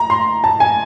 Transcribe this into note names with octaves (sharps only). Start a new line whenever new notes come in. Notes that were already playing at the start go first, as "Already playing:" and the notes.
Already playing: A#5
C6
A5
G#5